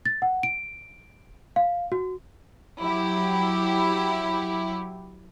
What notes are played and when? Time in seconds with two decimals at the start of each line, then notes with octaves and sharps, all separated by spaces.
0.06 A6
0.22 F#5
0.43 D7
1.56 F5
1.92 F#4
2.80 F#3 E4 G4